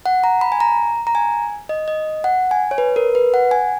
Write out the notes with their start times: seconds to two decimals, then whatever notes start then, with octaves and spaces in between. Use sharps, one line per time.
0.06 F#5
0.24 A#5
0.41 B5
0.52 G#5
0.60 A#5
1.07 A#5
1.15 G#5
1.69 D#5
1.88 D#5
2.24 F#5
2.51 G#5
2.71 C#5
2.78 B4
2.96 A#4
3.15 B4
3.34 F#5
3.51 G#5